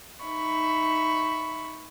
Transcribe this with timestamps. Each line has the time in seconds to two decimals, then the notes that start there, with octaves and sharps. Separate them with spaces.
0.23 D#4 E5 B5 C#6